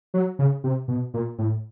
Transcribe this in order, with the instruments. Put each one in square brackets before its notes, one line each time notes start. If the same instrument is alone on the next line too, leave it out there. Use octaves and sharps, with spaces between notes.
[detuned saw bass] F#3
C#3
C3
B2
A#2
A2